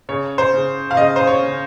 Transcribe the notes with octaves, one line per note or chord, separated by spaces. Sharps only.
C#3 C#5
C5
C#3
F5
C#3 D#5
C5
C#5
C#3